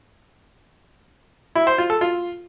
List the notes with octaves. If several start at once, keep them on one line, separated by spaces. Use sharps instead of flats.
E4
C5
F4
A4
F4